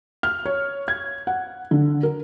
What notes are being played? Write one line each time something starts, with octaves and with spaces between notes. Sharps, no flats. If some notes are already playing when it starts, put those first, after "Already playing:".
F6
C#5
G#6
F#5
D3
A#4